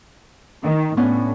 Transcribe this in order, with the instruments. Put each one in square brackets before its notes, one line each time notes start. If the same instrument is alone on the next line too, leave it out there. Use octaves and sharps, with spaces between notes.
[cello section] D#3
[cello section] A2 [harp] B3 C#4 D4